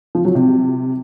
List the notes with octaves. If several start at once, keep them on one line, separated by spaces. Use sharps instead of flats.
F3
F#3
C3